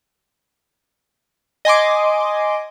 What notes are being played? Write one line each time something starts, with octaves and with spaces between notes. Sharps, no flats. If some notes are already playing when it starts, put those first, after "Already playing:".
D#5 G#5 C6 D6